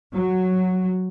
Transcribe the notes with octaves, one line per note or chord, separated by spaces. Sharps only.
F#3